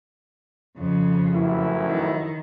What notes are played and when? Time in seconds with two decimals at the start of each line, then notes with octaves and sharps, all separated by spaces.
0.78 F2 C#3
1.33 A1 F#2 E4
1.86 D#3